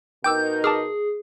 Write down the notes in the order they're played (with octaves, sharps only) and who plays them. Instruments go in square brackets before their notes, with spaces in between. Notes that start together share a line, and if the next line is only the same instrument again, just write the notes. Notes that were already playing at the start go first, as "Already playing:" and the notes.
[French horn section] B2 D#4 A#4 [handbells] G5 D6 E6 [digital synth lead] G6
[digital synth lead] G#4 [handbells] A5 D6 F6